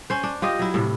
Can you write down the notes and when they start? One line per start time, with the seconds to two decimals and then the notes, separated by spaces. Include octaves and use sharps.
0.10 C#4 C5
0.23 D4
0.42 F4 G4 D#5
0.59 F#3 E4
0.74 A2 C3